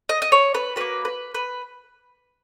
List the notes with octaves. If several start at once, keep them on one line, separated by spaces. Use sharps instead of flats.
D#5
D#5
C#5
B4
A#3 C#4 F#4 B4
B4
B4